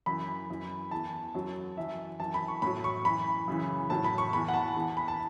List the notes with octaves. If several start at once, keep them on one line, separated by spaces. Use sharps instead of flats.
F#2 E3 B5
F#2 E3
E2 E3 A5
F#2 F#3
F#2 E3 E5
F#2 E3 A5
B5
C#6
A2 F#3 B5
C#6
F#2 E3 B5
F#2 C#3 E3
A2 F#3 A5
B5
C#6
E2 E3 B5
F#5
A5
E2 E3
B5
A5